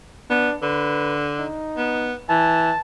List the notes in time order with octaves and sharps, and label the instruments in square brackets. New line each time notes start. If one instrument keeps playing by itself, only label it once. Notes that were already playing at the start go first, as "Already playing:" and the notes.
[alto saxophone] B3 [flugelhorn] D4
[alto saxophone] D3 [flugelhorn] B4
[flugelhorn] D#4
[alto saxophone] B3
[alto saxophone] E3 [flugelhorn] A5